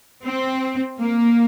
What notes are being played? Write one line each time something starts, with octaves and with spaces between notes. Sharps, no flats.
C4
A#3